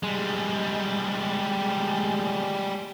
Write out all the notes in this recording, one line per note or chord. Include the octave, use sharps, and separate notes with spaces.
G3 G#3